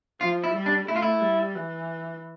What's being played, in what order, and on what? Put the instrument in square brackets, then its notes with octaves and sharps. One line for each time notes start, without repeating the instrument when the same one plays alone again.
[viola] F3 [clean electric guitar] F4
[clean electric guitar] E4
[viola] G3
[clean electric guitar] D4
[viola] A3 [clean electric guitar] E4
[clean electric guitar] F4
E4
[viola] G3
E3